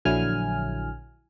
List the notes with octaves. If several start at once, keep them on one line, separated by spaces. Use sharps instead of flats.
A#1 D3 F#3 E4 G#5 F6